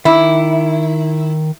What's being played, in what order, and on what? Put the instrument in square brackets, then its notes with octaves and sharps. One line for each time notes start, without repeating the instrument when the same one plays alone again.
[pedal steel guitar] D#3 D6 [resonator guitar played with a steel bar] E4